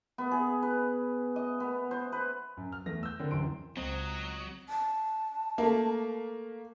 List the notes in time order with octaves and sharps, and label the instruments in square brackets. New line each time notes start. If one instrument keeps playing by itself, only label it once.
[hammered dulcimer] B3
G#4
B4
D#5
B3
C5
B4
[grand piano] F#2
F6
E2 A3 A#6
E6 G6
D3 C4 A#4
D1 A1 F#2 C6 D7
[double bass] C#2 [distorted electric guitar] F#3 [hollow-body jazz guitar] C4 [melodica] D#5 A#5
[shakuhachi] A5
[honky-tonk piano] A3 A#3